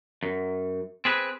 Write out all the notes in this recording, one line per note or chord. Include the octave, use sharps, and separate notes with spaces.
F#2
C4 G#4 B4